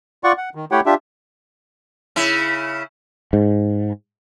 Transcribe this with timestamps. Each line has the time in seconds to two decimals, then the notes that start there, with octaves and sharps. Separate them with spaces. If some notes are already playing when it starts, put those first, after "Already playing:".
0.24 F4 D5 F#5 C#6
0.38 F#5
0.55 D#3
0.71 A3 E4 G4 C#5 F#5 G5
0.86 D4 F4 G4 E5
2.16 C#3 E4
3.33 G#2